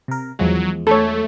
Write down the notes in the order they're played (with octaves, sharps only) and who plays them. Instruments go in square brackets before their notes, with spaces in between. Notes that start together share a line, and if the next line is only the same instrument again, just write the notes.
[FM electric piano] C3 A#4
[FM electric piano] E2 F3 G#3 [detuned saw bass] F#3
[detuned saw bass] A3 [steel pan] A4 C#5